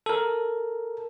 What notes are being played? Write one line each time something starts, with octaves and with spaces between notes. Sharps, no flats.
A4 A#4